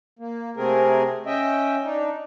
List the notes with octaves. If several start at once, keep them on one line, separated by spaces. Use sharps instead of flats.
A#3
C3 A3 C4 G#4 A#4
C#4 D#5 E5 G5
D4 D#4